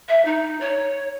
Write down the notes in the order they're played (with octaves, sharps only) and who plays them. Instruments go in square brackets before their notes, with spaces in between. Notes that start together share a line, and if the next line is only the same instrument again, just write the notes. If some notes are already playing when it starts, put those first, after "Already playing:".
[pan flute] E5
D#4
C#5